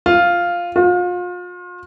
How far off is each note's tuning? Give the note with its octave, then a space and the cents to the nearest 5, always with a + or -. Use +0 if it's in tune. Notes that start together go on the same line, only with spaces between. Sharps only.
F4 +0
F4 +35